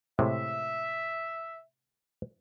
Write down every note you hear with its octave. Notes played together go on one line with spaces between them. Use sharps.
A2 C3 G#3 E5